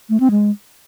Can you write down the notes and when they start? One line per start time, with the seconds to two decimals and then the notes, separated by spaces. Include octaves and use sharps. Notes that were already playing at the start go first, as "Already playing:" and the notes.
0.10 A3
0.20 C4
0.31 G#3